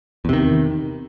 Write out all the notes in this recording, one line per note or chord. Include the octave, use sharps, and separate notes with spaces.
E2 C3 D#3